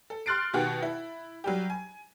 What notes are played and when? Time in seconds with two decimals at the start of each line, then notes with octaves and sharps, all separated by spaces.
0.10 A4
0.26 C6 F6 F#6 A6 C7 D7
0.53 B2 D#3 F#4 G4
0.82 E4
1.44 F#3 G3 G4
1.70 G#5